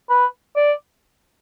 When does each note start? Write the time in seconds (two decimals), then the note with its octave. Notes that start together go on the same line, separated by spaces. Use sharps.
0.10 B4
0.56 D5